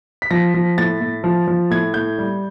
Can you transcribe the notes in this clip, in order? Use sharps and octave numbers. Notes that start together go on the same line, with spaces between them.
B6
F3 A#6
F3
A2 A6
A2
F3
F3
A2 G#6
A2 G6
G3